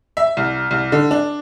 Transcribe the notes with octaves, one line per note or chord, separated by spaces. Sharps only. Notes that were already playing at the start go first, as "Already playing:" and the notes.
E5
C2
C2
D3
D4